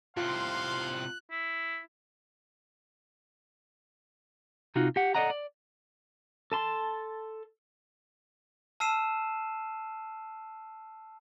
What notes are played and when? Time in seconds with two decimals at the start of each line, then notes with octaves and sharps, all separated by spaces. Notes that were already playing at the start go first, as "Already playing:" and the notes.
0.17 A2 C3 F4 F5 C6 F#6
1.31 E4
4.75 C3 D#4 F4 F#4
4.96 G4 F#5
5.15 A4 A#4 D5 D#5 F#5 A#5
5.30 D5
6.52 A4 A5 C6
8.80 A5 E6 F6 C7 D#7 E7